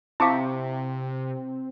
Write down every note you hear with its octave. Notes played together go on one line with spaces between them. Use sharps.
C3 C4 E4 F5 A5 C#6 D6